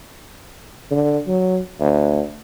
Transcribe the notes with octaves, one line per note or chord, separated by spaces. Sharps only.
D3
F#3
D2